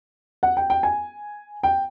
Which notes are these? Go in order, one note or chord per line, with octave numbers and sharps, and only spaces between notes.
F#5
G5
G5
G#5
G5